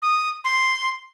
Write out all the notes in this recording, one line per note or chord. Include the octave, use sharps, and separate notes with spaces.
D#6
C6